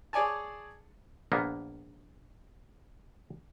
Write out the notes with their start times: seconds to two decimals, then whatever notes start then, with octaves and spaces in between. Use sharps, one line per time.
0.13 G#4 C#5 D5 G#5 A5
1.32 A#1 A#3 B3